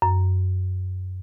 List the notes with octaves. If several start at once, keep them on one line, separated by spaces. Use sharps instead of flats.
F#2